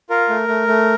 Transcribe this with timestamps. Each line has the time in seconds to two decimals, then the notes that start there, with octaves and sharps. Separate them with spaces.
0.10 F4 A#4
0.29 A3
0.48 A3
0.67 A3